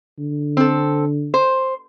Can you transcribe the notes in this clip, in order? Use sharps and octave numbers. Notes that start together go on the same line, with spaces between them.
D3
C4 A4
C5